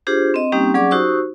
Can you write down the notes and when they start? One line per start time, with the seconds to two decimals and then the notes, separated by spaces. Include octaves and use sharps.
0.07 D4 F4 G4 G#4 C5
0.34 C4 D#5
0.52 G3 A#3 C4 C#4 D#4 G4
0.74 F#3 C#4 G#4 D5 D6
0.91 D#4 F#4 G4 C5 C#6 E6